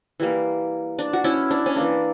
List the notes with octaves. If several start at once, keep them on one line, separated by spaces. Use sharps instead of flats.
E3 G3 A#3
D4
F#4
C#4 E4
D4
C#4
E3 A#3 D4